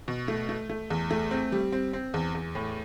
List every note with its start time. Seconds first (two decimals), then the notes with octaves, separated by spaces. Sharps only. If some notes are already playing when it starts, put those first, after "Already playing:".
0.08 B2
0.28 A3
0.49 A3
0.70 A3
0.90 E2
1.11 A3
1.31 C4
1.52 G3
1.72 C4
1.93 C4
2.14 E2
2.35 E2
2.55 A2